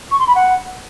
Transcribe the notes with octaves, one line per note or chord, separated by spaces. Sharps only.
C#6
C6
B5
F#5